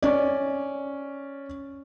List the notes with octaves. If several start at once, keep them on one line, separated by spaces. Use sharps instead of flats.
C#4 D5